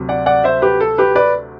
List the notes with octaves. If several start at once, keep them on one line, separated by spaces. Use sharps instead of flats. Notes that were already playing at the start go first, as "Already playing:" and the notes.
Already playing: D2 C3 F#3
D5 F#5
D5 F#5
C5 E5
G4 B4
A4
G4 B4
B4 D5